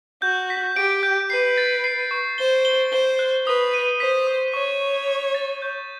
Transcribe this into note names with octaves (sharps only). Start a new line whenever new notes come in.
F#4 G6
B6
G4 D7
G6
B4 C7
A6
C7
C#6
C5 G7
G7
C5 G7
F#6
B4 D#6
D#7
C5 B6
D#6
C#5 C#6
C#6
C#6
A6
G6